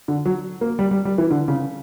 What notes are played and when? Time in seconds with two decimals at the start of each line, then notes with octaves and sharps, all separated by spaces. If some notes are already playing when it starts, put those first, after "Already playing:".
0.08 D3
0.25 F#3
0.61 A#3
0.79 G3
0.91 G3
1.05 G3
1.18 E3
1.31 D3
1.48 C#3